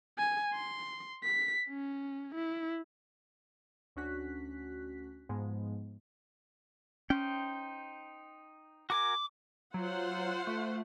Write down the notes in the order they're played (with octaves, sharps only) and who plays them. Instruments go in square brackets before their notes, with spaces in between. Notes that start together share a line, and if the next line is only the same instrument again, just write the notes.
[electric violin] G#5
C6
B6
C#4
E4
[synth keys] D2 C#4 D4 F#4 F#6 B6
G#2 F3 G#3 B3
[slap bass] C#4 [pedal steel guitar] D#4 C5 G5
[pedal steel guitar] F#4 A#4 G#5 [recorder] D6
[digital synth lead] F#3 [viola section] F4 C5 F#5
[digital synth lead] A3